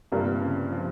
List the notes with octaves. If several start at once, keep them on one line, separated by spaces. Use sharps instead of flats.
G1 G2 C3 G3 A#3
C#3
F3